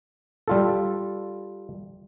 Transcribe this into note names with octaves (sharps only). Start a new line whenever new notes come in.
G3 F4 A4